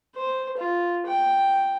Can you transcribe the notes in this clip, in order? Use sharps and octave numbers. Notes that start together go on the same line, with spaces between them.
C5
F4
G5